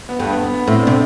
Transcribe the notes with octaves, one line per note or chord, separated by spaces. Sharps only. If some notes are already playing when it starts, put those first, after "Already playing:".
B3
G2 A3
B3
B3
B3
A2 C4
D4
C3